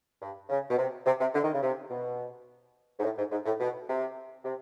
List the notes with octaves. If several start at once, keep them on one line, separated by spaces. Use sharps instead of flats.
G2
C#3
B2
C3
C3
C3
D3
D#3
C#3
C3
B2
G#2
A2
G#2
G#2
A2
B2
C3
C3